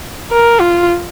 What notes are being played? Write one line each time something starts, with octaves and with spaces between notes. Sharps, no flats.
A#4
F4